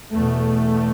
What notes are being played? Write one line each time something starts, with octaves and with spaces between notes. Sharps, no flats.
E2 B2 A3